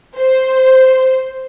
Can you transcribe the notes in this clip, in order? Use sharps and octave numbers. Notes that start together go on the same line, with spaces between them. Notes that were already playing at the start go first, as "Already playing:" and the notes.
C5